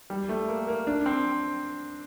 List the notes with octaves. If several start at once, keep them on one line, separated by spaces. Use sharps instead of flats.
G3
A3
A#3
A#3
D4
C4